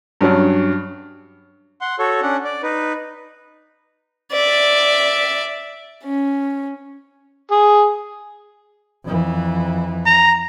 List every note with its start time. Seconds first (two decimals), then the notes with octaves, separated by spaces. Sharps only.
0.21 G2 F#3 C#4 D4
1.81 F#5 C6
1.99 F#4 A4 C#5
2.22 C#4 D4 F#5
2.44 D5
2.63 D#4 B4
4.32 D5 E5
6.04 C#4
7.51 G#4
9.04 F2 E3
10.06 A#5